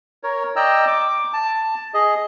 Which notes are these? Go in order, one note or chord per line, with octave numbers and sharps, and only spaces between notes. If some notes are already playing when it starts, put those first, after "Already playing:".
A#4 C#5
D5 D#5 G5 A#5 E6
D6
A5
G#4 D#5